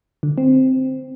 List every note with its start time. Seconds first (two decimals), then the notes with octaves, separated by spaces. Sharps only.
0.23 D3
0.38 C4